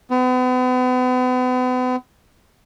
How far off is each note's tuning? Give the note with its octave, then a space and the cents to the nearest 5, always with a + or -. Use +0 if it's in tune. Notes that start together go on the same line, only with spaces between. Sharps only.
B3 +40